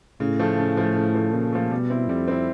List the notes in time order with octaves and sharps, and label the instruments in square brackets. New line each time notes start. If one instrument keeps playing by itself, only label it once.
[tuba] A2 [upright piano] C#3
[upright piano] F3 A3
C#3
F3 A3
C#3
F3 A3
[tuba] A#2 [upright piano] C#3
[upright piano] F3 A3
[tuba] B2 [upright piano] G3
[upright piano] C4 E4
[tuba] F2 [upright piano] G3
[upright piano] C4 E4